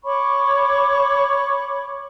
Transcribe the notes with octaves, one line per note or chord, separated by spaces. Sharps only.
C#5 B5 C#6 D6